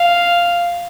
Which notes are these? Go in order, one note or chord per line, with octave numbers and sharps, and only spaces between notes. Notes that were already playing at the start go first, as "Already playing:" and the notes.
Already playing: F5